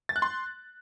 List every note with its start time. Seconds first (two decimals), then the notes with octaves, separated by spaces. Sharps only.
0.09 A6
0.16 F#6
0.22 C6